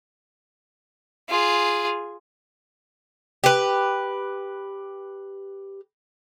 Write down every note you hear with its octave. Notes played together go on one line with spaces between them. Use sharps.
F4 G#4
G4 B4